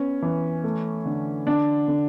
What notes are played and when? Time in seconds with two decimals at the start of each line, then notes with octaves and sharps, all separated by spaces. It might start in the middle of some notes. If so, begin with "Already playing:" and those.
Already playing: B3 C#4
0.22 E3
0.64 A3
1.06 D3
1.47 D3 D4
1.88 D3